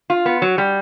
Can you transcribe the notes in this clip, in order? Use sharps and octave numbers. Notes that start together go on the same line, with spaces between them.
F4
B3
F#3
G3